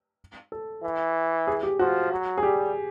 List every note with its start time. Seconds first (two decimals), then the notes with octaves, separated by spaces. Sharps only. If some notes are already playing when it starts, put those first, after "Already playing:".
0.52 A4
0.84 E3
1.47 G#4
1.63 G4
1.79 F3 F#4
2.12 F#3
2.38 G#4
2.43 G3 G4